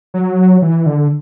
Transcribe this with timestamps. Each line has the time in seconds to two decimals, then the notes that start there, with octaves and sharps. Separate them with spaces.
0.14 F#3
0.62 E3
0.86 D3